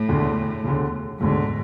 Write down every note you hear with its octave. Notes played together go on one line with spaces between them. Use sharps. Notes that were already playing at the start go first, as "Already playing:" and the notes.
Already playing: A2
E1 D2 D3
E1 D2 D3
E1 D2 G#2 D3